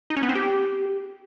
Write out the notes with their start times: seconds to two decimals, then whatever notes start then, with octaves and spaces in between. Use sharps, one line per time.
0.10 D#4
0.16 C#4
0.23 B3
0.29 C4
0.35 G4